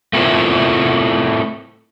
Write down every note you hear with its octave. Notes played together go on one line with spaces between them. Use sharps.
A3 C4 E4 F4 A#4 C5